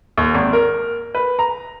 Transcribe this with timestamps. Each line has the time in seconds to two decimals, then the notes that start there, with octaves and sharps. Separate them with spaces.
0.18 D#2
0.34 G#1
0.53 A#4
1.15 B4
1.39 A#5